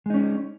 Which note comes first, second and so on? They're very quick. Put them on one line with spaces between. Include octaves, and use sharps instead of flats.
G#3 D#4 C#4